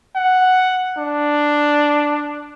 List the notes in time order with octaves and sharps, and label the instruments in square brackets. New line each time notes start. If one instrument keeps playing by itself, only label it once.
[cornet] F#5
D4